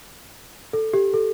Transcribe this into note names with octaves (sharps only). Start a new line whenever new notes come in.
A4
G4
A4